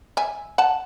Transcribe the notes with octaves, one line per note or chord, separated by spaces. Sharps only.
E5 G#5
F#5 A5